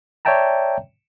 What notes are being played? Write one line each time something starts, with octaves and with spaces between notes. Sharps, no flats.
C#5 D5 E5 G5 A5 A#5